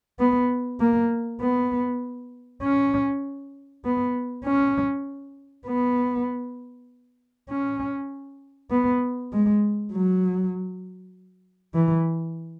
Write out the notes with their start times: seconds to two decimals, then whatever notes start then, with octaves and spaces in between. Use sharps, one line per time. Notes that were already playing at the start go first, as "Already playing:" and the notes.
0.19 B3
0.80 A#3
1.41 B3
2.62 C#4
3.85 B3
4.45 C#4
5.67 B3
7.50 C#4
8.71 B3
9.32 G#3
9.93 F#3
11.75 E3